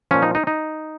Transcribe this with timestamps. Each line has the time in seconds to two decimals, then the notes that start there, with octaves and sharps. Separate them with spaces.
0.11 A#2 F3 C#4
0.22 D#4
0.35 D#4
0.47 D#4